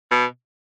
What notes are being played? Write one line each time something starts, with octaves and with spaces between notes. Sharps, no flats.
B2